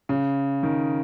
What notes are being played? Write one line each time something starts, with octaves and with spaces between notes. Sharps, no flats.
C#3
D#3